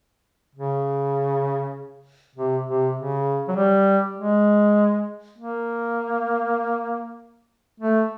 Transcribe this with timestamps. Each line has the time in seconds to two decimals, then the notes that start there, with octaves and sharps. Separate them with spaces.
0.55 C#3
2.36 C3
2.67 C3
2.97 C#3
3.48 F#3
3.56 G3
4.18 G#3
5.38 A#3
7.80 A3